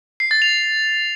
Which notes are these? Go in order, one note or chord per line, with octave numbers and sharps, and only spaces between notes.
C7
A6
F7